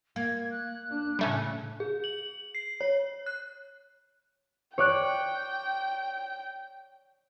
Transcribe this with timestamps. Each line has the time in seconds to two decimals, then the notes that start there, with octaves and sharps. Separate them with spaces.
0.16 A#3 G#6
0.50 F#6
0.90 D4
1.19 A2 C#3 G3 A3 C#4
1.80 G#4
2.04 F#7
2.55 C7
2.81 C#5
3.26 F#6
4.78 C#5 D5 G5 F#6